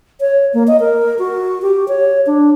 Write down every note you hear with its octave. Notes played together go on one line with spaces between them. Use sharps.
C#5
A#3
D#5
A#4
F#4
G4
C#5
D4